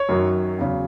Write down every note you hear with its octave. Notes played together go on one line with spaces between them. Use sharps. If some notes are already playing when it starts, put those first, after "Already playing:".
Already playing: C#5
F#2 D#3 F#3
E2 C#3 F#3